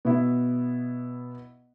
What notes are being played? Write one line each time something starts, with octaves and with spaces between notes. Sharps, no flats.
B2 B3 E4